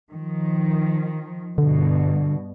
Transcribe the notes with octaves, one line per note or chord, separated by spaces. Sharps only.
D#3 F3
G2 B2 D3